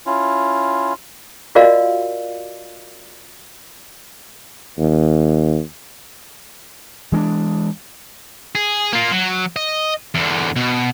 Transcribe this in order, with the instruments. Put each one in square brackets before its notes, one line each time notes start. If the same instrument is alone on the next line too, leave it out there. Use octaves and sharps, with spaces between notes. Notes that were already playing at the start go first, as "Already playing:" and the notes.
[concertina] C#4 E4 F4
[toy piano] F4 F#4 A#4 D5 D#5 F5
[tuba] D#2
[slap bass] E3 G#3 C4 D4
[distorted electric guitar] G#4
A#3 F4
F#3
D#5
E2 D3
B2